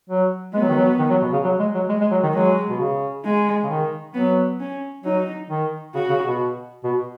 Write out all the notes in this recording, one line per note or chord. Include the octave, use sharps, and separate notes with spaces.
F#3
G#3 B3
F#3
D#3
F#3
D#3
F#3
B2
C#3
F#3
G#3
F#3
G#3
G#3
F#3
D#3
F#3 G#3
B2
C#3
G#3
C#3
D#3
F#3 B3
C#4
F#3 D#4
D#3
C#3 F#4
C#3
B2
B2